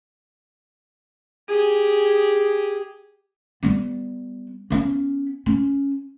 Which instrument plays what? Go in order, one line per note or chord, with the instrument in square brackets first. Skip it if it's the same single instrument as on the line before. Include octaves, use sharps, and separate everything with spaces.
[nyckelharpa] G4 G#4
[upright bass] G3 B3
B3 C#4
C#4